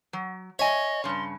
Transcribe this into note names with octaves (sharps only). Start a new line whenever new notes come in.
F#3
C#5 D#5 E5 G#5
G2 C#3 C6